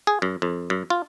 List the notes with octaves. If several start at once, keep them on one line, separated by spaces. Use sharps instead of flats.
G#4
F#2
F2
F#2
F4